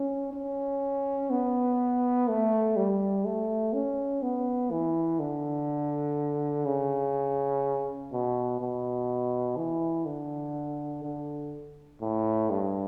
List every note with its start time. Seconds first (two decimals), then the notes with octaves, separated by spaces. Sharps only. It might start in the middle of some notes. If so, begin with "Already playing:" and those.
Already playing: C#4
0.33 C#4
1.31 B3
2.28 A3
2.76 G3
3.25 A3
3.73 C#4
4.22 B3
4.71 E3
5.20 D3
6.66 C#3
8.12 B2
8.61 B2
9.57 E3
10.06 D3
11.04 D3
12.01 A2
12.50 G2